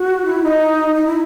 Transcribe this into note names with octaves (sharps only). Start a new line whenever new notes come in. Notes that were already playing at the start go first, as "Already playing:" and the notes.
Already playing: F#4
E4
D#4
D#4
E4